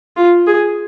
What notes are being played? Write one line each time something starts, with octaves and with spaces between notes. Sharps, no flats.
F4
G#4